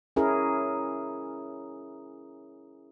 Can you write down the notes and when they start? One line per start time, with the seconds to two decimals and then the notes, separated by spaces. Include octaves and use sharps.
0.16 C#4 E4 G#4 A#4